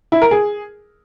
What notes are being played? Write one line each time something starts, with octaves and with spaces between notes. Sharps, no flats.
E4
A#4
G#4